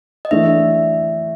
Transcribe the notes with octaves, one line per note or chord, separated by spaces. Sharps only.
D#5
E3 A3 D4 E5